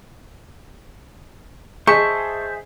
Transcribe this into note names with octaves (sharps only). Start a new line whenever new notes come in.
G#4 C5 D#5 E5 A5 C#6